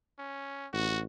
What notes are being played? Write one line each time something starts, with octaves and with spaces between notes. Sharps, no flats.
C#4
A1 F#4